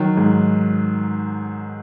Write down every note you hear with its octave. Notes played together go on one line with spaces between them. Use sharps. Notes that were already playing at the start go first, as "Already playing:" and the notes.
Already playing: D#3 F#3
G#2